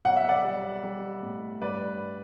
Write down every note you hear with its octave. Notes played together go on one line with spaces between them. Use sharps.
B1 F#5
E5
D5 F#5
G3
G3
A2
G2 B4 D5